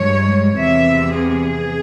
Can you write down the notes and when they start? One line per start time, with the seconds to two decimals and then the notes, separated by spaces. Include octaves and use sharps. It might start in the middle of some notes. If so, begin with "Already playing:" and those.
Already playing: G2 F3 G#3 C#5
0.57 E2 C3 F3 E5
1.14 G#4